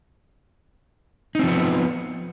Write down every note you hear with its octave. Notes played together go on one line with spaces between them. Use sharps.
F3 B3 C4 D#4